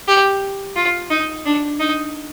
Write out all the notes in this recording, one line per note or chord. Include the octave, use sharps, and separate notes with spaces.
G4
F4
D#4
D4
D#4